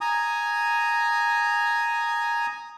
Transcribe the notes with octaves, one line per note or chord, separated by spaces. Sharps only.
G#5 A#5 D#6